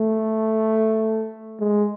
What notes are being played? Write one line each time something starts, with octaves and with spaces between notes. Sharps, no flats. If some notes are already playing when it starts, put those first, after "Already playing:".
Already playing: A3
G#3